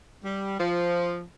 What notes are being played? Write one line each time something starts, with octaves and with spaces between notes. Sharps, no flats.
G3
F3